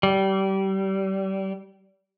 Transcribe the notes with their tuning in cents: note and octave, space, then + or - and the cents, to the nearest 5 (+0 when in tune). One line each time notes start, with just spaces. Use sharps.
G3 -25